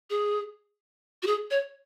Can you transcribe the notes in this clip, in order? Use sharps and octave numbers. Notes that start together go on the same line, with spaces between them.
G#4
F#4
G#4
C#5